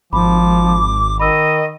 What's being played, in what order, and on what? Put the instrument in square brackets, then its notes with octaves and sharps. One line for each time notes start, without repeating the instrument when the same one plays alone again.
[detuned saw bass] G#1 [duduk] F3 [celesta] B5 [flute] D6
[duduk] D#3 [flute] D#5 [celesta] B5 D#6 E6